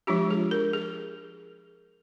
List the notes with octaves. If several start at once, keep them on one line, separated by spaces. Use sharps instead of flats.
F3 G#3 D4 F4 G4
G#4
A#4
G#4